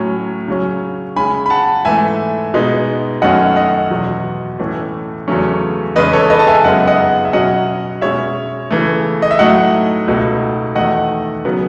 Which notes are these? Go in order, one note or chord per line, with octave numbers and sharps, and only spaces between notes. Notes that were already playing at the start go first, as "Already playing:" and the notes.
Already playing: A2 F#3 C#4
C#3 F#3 C#4
C#3 G#3 C#4 G#5 B5
B5
F#5 A5
G#2 E3 A3 E5 G#5
B2 G#3 B3 D#4
F#2 D#3 A3 C#4 D#5 F#5
D#5 F#5
E2 B2 F#3
A2 E3 A3 C#4
E2 C#3 F#3 A3 C#4
E2 C#3 G#3 B4 D#5
A4 C#5
B4 D#5
A5
E5 G#5
F#2 C#3 G#3 B3 D#4 D#5 F#5
D#5 F#5
E5
B2 F#3 C#4 D#5 F#5
B2 G#3 C#4 C#5 E5
C#3 E3 A3
D#5
E5
A2 F#3 A3 D#4 D#5 F#5
C#2 B2 A3 D#4
E2 D#3 A3 D#4 D#5 F#5
C#3 F#3 B3